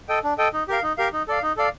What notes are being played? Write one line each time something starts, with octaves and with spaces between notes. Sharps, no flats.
A4 D#5 G5
D4
A4 D#5 G5
D#4
G4 A#4 F5
D#4
G4 A#4 F5
D#4
A4 D5 F5
D#4
A4 D5 F5